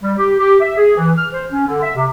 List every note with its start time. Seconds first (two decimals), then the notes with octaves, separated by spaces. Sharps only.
0.02 G3
0.17 G4
0.39 G4
0.61 E5
0.77 G#4
0.97 E3
1.18 F6
1.32 C5
1.51 C#4
1.68 D3
1.83 E5
1.95 C3